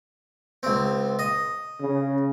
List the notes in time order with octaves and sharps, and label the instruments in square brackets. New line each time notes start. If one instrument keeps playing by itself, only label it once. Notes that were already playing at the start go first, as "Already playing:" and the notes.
[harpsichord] C#2 C4
D#5
[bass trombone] C#3